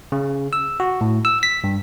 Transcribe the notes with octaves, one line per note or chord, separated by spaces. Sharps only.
C#3
E6
F#4
A2
E6
B6
G2